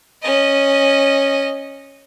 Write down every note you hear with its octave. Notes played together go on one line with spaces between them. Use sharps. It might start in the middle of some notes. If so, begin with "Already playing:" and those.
C#4 D#5